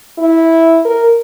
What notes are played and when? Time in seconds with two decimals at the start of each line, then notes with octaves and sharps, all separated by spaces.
0.18 E4
0.85 A#4